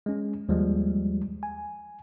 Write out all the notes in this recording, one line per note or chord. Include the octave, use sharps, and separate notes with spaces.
G#3 C#4
D#2 F3 G3 G#3
G#5